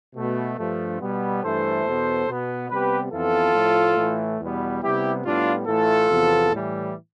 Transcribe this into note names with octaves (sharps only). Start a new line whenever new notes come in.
B2 A3
G2 F3 A3
B2 G3 B3
G2 E3 A3 A4 C5
E2 B2 B3
B2 B3
C3 G3 B3 G4 B4
F2 E3 B3 F4 A4
A2 F3 A3
A2 E3 A3
E2 B2 G3 B3
C3 G3 B3 E4 G4
A2 G3 B3 D4 F4
A2 E3 A3 F4 A4
E2 C3 F3 B3
A2 E3 G3